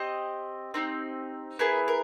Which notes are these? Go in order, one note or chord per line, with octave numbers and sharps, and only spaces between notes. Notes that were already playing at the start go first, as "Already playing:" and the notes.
Already playing: C4 G4 D#5
C4 D#4 G4
B3 E4 G#4 A#4
A#4